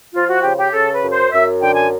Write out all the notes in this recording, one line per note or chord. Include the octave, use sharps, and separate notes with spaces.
F3 F4
F#4
C#3 G4
G4
C#3 A4
B4
F#2
C5
F#2 E5
D3 G5
G#5